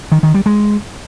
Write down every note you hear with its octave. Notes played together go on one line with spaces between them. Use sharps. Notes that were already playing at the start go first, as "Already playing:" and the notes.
D#3
D#3
G3
G#3